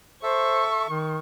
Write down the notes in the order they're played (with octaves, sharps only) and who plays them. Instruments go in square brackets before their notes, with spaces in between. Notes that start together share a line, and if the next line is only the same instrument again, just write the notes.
[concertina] A4 E5 [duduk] C5 [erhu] C#6
[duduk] D#3